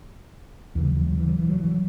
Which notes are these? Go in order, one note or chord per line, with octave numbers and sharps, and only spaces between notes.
D#2 C#3 E3
F#3
E3
F#3
E3
F#3
E3
F#3
E3
F#3